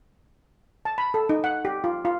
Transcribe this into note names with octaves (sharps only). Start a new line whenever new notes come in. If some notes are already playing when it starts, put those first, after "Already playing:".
A5
B5
A4
D#4
F#5
G4
F4
F4